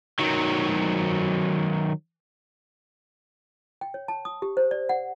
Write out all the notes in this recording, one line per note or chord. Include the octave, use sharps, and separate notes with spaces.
D#3 F#3
G5
C#5
A5
D#6
G4
C5
D5
F#5